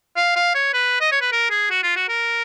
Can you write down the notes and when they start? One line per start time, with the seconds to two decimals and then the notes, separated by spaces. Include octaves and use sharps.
0.17 F5
0.36 F5
0.55 C#5
0.74 B4
1.01 D#5
1.12 C#5
1.21 B4
1.32 A#4
1.50 G#4
1.71 F#4
1.83 F4
1.96 F#4
2.09 A#4